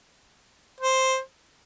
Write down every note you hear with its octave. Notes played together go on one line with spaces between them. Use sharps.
C5